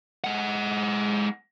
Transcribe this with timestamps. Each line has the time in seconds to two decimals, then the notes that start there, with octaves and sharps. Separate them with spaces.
0.24 G#3 F#5